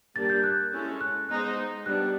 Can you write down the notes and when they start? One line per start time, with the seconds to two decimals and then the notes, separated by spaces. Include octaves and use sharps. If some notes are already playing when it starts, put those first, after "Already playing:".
0.15 G3 A#3 D4 G4 A6
0.30 G6
0.44 F#6
0.72 G#3 C#4 E4 A4
1.01 F#6
1.28 G#3 B3 D#4 G#4 C5 F#6
1.85 G3 B3 D4 F#6